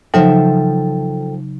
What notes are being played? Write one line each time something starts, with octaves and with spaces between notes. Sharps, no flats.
C#3 F3 F#3 D#4 A4 C5 E5 G5